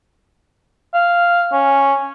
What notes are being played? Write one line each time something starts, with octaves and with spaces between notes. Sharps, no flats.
F5
C#4